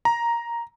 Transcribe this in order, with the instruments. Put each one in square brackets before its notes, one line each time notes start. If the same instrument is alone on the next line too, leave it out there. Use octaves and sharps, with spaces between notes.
[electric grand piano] A#5